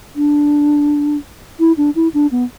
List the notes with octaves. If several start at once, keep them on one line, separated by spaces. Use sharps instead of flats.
D4
E4
D4
E4
D4
B3